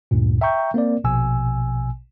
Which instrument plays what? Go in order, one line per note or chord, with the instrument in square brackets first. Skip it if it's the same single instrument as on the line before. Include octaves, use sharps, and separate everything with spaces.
[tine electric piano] D2 G2 A#2
E5 G5 A#5 C#6 G6
A#3 C4 A#4 D5
A#1 B2 G#5 E6